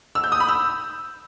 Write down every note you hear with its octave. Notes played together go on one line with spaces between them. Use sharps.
E6
G6
D#6
B5
E6